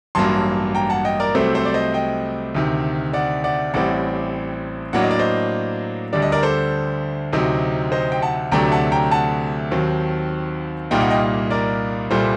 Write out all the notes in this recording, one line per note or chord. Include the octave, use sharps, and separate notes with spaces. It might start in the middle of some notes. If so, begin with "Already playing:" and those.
A1 G2 F#3 A#3 A5 C6
G5 A#5
F#5 A5
D#5 G5
A#4 D5
C2 C3 F#3 A3 C4 A4 C5
A4 C5
D5
C5 D#5
D#5 G5
D2 C3 D#3
D5 F#5
D5 F#5
A1 A2 G3 C4 D5 F#5
A2 F#3 A#3 D4 F#5
D#5
D5
C5 D#5
D2 D3 G3 D4 D5
D#5
A#4 D5
A4 C5
D2 C3 F#3 C4 D#4
C5 D#5
G5
F#5 A5
D2 C3 F#3 A3 D4 G5 A#5
F#5 A5
G5 A#5
F#5 A5
D#2 D#3 F#3 C4
C2 A#2 G3 A#3 D#4 G5
F#5
D#5 G5
A#4 D5
C2 A#2 G3 A4 C5